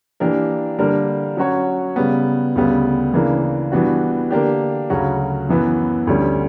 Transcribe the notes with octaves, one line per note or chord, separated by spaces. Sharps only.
E3 A#3 D4 G4 A#4
D3 G3 A#3 D4 A#4
F#3 C#4 F#4 C#5
C#3 G3 B3
D2 C#3 G3 B3
C#3 E3 A#3 D4
E3 G3 B3 D4 F#4
D3 A#3 D4 G4
D2 C#3 F#3 C#4 F#4
F#2 E3 B3
D2 D3 G3 C#4